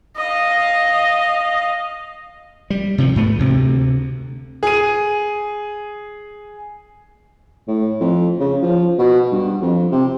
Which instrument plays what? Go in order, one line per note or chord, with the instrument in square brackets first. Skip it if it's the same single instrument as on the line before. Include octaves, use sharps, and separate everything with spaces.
[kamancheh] D#5 F5
[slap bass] G3
C3 D#3 F3
G#2 A3 B3
D2 C3
[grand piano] G#4 D#7
[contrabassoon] A2
F2
C#3
F3
B2
G2
F2
C3